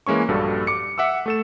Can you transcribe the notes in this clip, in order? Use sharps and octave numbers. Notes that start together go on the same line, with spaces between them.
E3 G#3 A#3 C#4 C#6
A#1 G2 G3 F#4 A4
D6 C#7
E5 F#5 D6 E6
A3 A4 E7